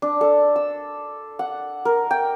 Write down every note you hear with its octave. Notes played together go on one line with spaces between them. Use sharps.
D4
A4
E6
F#5
A#4
G5